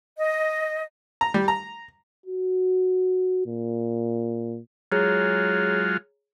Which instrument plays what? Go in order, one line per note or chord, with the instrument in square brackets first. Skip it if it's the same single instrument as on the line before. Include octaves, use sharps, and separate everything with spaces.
[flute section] D#5
[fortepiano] A#5
G3
A#5
[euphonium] F#4
A#2
[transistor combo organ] F#3 G#3 F4 [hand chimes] G#4 C#5 A#5